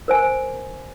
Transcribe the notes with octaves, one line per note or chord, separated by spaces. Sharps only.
A#4 C5 G#5